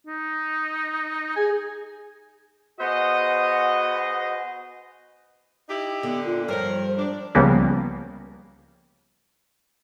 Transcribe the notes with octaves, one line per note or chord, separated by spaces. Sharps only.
D#4
G#4 G#5
B3 F#4 G#4 C5 D#5
D#4 E4 G4
D3 B3
A#2 F4
G2 F3 A#4 C5 C#5
D4
C#2 C#3 F3 G3 A#3 B3